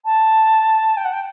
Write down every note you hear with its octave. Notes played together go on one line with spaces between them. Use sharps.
A5
G5
F#5
G5